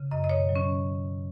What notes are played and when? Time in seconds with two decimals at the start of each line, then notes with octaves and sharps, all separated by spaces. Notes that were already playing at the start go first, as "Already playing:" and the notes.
Already playing: C#3
0.11 F#2 D#5
0.24 D#5
0.29 B2 C#5
0.49 F#3
0.56 C#4